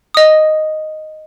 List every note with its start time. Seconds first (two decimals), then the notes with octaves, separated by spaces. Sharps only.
0.14 D#5 D#6